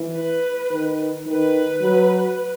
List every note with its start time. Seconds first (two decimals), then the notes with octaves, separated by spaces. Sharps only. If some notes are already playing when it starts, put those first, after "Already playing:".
Already playing: E3
0.15 B4
0.71 D#3
1.25 D#3 B4
1.81 F#3